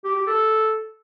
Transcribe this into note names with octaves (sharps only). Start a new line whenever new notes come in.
G4
G4
A4